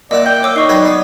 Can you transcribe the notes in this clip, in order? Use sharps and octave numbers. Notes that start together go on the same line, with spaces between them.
A#2 E4 D5 D#5 F#5
G5 G6
C#5 D6 E6
D#4 D#5 C#6 C7
F#3 B4 D5 D#5 G#6
B3 D#6